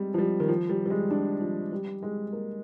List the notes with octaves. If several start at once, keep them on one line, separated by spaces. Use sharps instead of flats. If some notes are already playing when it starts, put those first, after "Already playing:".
Already playing: G3 G#3 C4
F3
G3
D#3
F3
G3
G3
G#3
D4
F3
G3
G#3
A#3